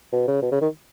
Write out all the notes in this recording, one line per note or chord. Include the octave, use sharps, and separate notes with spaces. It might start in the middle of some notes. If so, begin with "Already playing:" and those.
B2
C#3
B2
C#3
D#3